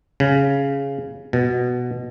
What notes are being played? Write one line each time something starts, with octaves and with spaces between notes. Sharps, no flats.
C#3
B2